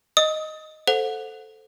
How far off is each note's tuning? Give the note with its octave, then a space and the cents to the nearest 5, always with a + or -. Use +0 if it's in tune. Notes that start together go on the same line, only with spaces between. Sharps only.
D#5 +0 D#6 +25
A4 +0 C5 +0 F#5 -30